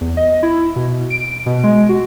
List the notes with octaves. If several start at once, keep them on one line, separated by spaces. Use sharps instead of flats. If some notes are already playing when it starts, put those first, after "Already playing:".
E2
D#5
E4
B2
D7
B2
G#3
F#4